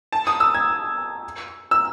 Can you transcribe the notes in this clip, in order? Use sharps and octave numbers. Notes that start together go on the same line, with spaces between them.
A5
D#6
E6
G#6
E6